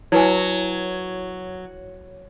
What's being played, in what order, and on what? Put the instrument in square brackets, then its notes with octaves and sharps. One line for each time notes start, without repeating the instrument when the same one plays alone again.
[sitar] F#3 [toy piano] E4 B4 G#5